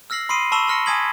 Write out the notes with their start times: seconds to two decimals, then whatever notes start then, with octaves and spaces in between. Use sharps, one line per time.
0.10 E6 F6 A#6 C7 F#7
0.29 B5 C6 D#6 C7 D7 D#7
0.52 A5 B5 C#6 E6 E7 G7
0.67 A5 C6 E6 F6 A#6 C#7
0.86 G#5 A5 D#6 G#6 B6 F#7